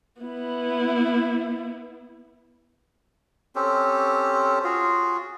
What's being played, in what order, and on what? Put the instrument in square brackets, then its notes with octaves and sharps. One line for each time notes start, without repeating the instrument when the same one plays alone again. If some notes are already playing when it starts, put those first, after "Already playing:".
[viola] B3 E4
[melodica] C4 C#4 G4 A4
F4 F#4 G#4